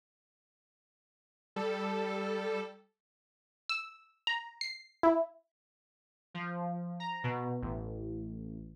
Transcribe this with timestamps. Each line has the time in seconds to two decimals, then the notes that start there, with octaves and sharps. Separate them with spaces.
1.56 G3 A4
3.69 E6
4.27 A#5
4.61 C7
5.03 E4
6.34 F3
7.00 A#5
7.24 B2
7.62 A1